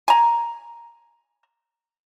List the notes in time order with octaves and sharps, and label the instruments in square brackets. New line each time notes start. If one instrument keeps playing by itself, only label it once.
[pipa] G#5 A#5